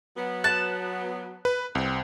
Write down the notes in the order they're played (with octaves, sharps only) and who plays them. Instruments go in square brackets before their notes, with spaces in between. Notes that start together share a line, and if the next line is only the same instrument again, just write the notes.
[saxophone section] F#3 B3
[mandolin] A5 [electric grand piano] F#6
[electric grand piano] B4
[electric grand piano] C2 [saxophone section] C4